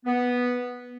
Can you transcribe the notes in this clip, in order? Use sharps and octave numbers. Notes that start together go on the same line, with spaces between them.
B3